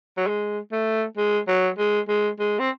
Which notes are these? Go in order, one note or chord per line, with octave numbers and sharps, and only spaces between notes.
F#3
G#3
A3
G#3
F#3
G#3
G#3
G#3
C4